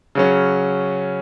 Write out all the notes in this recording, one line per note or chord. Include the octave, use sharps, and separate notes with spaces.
C#3 F#3 C#4